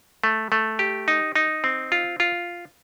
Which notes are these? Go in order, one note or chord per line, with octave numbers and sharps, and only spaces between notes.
A3
A3
G4
D#4
D#4
C4
F4
F4